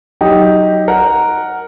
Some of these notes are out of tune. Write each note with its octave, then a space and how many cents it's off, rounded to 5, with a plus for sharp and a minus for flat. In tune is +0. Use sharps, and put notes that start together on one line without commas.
F#3 +20 D#4 +5 G4 +0
A#4 +0 F#5 +0